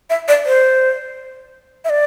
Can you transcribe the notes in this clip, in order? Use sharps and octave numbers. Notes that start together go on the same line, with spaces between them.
E5
D5
C5
E5
D5